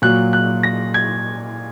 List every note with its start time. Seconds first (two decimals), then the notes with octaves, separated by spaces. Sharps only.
0.02 A#2 F#3 F#6
0.33 F#6
0.63 A#6
0.94 G#6